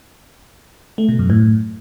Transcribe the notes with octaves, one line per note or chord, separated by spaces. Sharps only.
A3
B2
F#2
A2